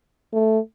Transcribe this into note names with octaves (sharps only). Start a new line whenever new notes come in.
A3